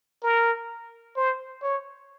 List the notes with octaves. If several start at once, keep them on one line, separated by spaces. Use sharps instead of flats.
A#4
C5
C#5